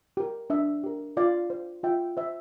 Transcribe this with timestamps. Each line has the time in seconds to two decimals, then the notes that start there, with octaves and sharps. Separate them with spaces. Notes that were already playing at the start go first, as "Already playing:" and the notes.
0.17 G4 A#4
0.50 D4 E5
0.84 G4 A#4
1.17 F4 D5 F5
1.50 C5
1.83 F4 E5 G5
2.17 C5 E5